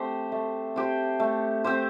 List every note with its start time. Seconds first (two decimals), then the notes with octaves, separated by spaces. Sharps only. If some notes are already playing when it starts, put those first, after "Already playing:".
Already playing: A3 C4 G4 C5
0.32 A3
0.76 C4 G4 C5
1.20 A3
1.64 C4 G4 C5